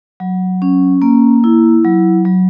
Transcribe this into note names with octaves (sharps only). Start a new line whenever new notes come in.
F#3
C#4
A#3
E4
F#3
F#3